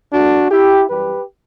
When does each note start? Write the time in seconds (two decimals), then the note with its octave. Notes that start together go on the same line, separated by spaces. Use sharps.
0.13 E2 D3 A3 D4 F#4
0.51 E4 G4
0.89 F#2 E3 G3 G4 B4